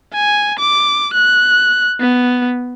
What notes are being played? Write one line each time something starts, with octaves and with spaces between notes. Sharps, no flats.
G#5
D6
F#6
B3